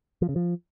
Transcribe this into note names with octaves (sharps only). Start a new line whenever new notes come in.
F3
C#3
F3